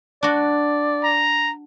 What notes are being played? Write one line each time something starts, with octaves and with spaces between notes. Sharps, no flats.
D4 F#4 D5
A#5